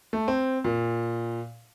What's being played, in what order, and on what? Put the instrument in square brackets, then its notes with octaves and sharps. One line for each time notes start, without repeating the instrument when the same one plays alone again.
[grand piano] A3
C4
A#2